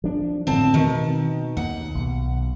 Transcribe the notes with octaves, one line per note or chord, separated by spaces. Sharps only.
F3 D4
A2 D3 F3 C4 A5
B2 D#3
D#2 F#5
B1